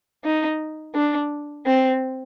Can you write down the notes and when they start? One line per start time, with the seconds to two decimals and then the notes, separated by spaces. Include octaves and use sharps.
0.24 D#4
0.95 D4
1.66 C4